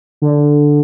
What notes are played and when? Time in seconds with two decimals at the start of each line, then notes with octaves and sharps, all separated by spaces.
0.22 D3